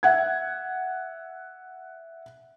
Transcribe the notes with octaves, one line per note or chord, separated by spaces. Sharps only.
E5 F#5 G#6